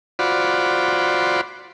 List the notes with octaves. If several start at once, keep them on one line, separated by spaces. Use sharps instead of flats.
F4 F#4 C5 D5 B5